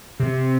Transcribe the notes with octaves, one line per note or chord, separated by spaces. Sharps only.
C3